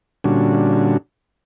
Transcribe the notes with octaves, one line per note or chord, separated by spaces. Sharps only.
A#2 D3 G3 C#4 D4 F#4